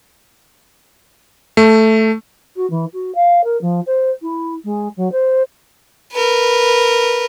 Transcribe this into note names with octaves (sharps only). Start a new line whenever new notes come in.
A3
F#4
E3
F#4
F5
A#4
F3
C5
E4
G#3
F#3
C5
A#4 B4